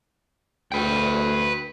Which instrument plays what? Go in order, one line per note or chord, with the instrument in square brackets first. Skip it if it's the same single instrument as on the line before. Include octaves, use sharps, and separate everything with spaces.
[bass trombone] D2 [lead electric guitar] B4 G5